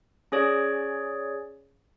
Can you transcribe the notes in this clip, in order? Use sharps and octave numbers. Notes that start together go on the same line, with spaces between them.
C#4 G#4 C#5 D5